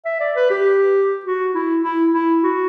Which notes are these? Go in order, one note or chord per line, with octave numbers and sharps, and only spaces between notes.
E5
D5
B4
G4
F#4
E4
E4
E4
F#4